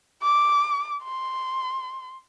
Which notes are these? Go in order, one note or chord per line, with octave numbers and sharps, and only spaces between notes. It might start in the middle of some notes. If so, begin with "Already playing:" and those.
D6
C6